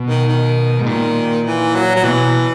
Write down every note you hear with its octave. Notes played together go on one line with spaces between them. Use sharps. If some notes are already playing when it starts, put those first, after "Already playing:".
Already playing: B2
D#3
D#3
G#2
A#2 D#3
E3
F#3
F#3
B2 E3